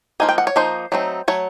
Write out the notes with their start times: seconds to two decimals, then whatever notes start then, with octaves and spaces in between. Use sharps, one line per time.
0.20 F3 A#3 D#4 G#5
0.29 G5
0.38 F#5
0.47 C#5
0.56 F3 A#3 D#4 C5
0.92 F#3 A3 C4 D#4
1.28 F#3 A3 C#5